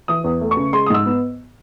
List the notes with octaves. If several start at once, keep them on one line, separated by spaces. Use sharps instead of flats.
E3 D#6
E2
A3
C#6
C#3
G#3 C6
D#6
G#2 E6
B3